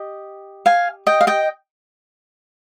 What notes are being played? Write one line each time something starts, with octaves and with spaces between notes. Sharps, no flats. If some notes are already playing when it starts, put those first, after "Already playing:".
Already playing: G4 D#5
F5 G#5
D#5 G5
F5
D#5 G5